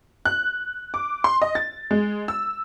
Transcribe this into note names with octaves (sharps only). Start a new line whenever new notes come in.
F#6
D6
C6
D#5
A6
G#3
E6